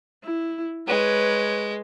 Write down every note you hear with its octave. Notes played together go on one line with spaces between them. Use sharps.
E4
G#3 B4 C#5